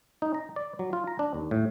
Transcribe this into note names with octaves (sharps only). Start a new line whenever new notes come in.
D#4
A#5
D5
F#3
F4
A#5
D4
D#2
A2